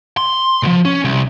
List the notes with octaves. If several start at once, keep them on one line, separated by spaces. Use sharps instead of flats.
C6
C2 F3
C#4
C2